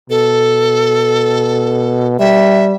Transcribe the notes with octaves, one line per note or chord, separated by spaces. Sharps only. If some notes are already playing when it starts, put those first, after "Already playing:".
B2 A4
G3 E5